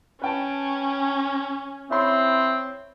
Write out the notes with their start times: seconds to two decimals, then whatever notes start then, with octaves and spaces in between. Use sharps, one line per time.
0.22 C#4 B4 G5 A5
1.91 C4 E4 C#5 B5 C6